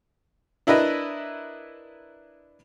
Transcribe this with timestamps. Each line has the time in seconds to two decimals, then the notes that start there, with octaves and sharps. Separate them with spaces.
0.67 D4 E4 A#4 B4 D#5